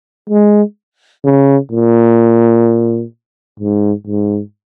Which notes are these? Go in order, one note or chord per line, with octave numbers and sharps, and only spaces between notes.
G#3
C#3
A#2
G#2
G#2